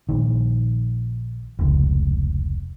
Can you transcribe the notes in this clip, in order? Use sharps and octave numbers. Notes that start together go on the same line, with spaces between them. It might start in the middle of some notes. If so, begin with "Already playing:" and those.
A#1 D#3
F1 C#2